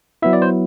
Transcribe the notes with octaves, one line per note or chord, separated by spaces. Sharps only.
F#3 B3 E4 E5
D5
C5